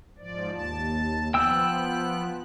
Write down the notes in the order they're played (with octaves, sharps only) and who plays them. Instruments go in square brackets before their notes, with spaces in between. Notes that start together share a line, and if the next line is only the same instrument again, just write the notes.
[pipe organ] G#2 F3 D5
D#2 A5
[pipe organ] F3 B3 F#6 [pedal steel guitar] G5 E6